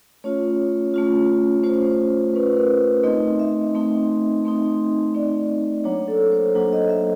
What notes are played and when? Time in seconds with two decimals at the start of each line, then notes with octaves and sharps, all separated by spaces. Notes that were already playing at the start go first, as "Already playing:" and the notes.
0.24 A3 C#4 F4 C#5
0.94 A3 C#4 F4
1.63 A3 C#4 F4 C5
2.34 A3 C#4 F4 B4
2.57 A#4
3.03 A3 C4 D#4 D#5
3.39 E5
3.75 A3 C4 D#4
4.45 A3 C4 D#4
5.14 A3 C4 D#4 D5
5.84 F#3 A#3 D4 C#5
6.08 A4
6.32 C5
6.55 F#3 A#3 D4
6.73 D#5
6.89 E5